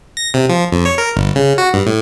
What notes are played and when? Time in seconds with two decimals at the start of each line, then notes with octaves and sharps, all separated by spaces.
0.17 A#6
0.34 C3
0.49 F3
0.72 F2
0.86 C#5
0.98 A#4
1.16 G1
1.36 C#3
1.58 F#4
1.74 G2
1.86 A2